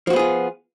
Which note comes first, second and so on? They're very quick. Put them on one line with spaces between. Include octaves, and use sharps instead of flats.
F3 F#4 B3 G#4 F4